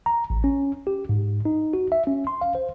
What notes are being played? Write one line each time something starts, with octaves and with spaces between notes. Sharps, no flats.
A#5
A1
C#4
G4
G#2
D#4
F#4
E5
C#4
C6
F5
C5